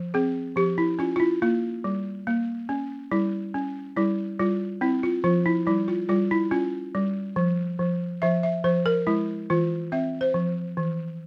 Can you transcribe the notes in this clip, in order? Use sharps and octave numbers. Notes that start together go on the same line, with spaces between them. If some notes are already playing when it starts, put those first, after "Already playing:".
Already playing: F3
C4 G#4
F3 G4
E4
C#4 F4
F4
E4
A#3 F4
G3
A#3
C#4
G3 E4
C#4
G3 E4
G3 F4
C4 E4
F4
F3 F4
E4
G3 E4
F4
G3 F4
E4
C#4 F4
G3
F3
F3
F3 E5
E5
F3 C5
A#4
G#3 E4
E3 F4
C4 E5
C5
F3
E3